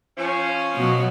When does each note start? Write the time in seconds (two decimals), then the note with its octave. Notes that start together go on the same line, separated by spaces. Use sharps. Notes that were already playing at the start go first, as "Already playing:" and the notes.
0.18 F3 C#4
0.76 B2 F#3